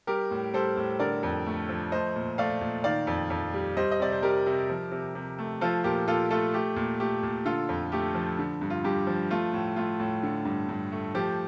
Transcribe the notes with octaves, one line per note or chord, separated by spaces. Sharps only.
G3 G4 A#4
A2
G3 A4 C5
A2
D3 A#4 D5
F2
A3
F3
A3 C5 D#5
A#2
A3 D5 F5
A#2
D#3 D5 F5
F2
F2
G3
G3 C5 D#5
D#5
C3 D5
C5
G3 G4 A#4
C3
F3
C3
C3
A3
F3 F4 A4
A#2 G4 A#4
A#2 F4 A4
A3 F4 A4
A3 G4
A#2
A3 G4
A#2
D3 F4 A4
F2
A3 G4
F3
D3
G2
F4
G2 G4
F3
A3 F4
A2
A3 F4
A2
D3
G2
G2
A3
F3 G4